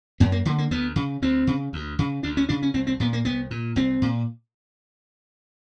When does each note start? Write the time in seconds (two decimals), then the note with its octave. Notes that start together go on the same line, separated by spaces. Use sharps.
0.20 F#2 B3
0.32 A#3
0.45 D3 A#3
0.58 A#3
0.71 D2 B3
0.96 C#3
1.22 D2 C4
1.47 C#3
1.73 D2
1.99 C#3
2.23 D2 D4
2.37 C#4
2.49 C#3 D4
2.62 C#4
2.74 C2 C4
2.87 C4
3.00 A#2 B3
3.13 A#3
3.25 C2 B3
3.51 A#2
3.76 C2 C4
4.02 A#2